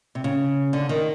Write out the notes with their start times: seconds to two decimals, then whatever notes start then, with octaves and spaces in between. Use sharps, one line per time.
0.15 C3
0.24 C#3
0.73 D3
0.89 D#3